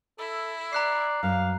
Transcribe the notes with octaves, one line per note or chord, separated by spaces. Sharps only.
E4 A4
D5 A#5 F#6 C7
F#2 F5